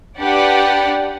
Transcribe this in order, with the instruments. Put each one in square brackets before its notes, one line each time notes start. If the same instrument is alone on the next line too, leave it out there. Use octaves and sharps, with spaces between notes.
[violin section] D4 G4 B4 D5 F#5